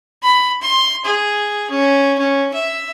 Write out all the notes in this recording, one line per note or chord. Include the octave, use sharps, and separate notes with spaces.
B5
C6
G#4
C#4
C#4
E5